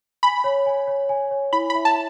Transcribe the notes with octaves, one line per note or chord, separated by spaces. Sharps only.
G#5 B5
C#5
G#5
C#5
G#5
C#5
E4 B5
B5
E5
A5